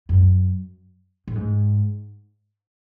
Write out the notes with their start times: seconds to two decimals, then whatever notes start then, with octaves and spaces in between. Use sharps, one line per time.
0.09 F#2
1.27 A2
1.35 G#2